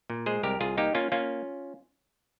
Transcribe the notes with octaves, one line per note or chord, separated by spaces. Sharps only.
A#2
G#3 G#4 C5
C2 G4 A#4
C2 F4 G#4
A#3 D#4 G4
A#3 C#4 F4
A#3 C#4 F4